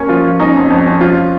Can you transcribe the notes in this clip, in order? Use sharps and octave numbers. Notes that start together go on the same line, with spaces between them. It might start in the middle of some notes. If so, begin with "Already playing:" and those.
Already playing: A#3 C#4 C#5
F3 F4
F3
C#4 D#4
F2
F2
C#4
F3 F4